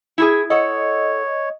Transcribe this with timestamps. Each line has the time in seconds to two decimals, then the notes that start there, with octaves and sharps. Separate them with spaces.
0.18 E4 F#4 G#4
0.50 A4 C#5 D#5 F#5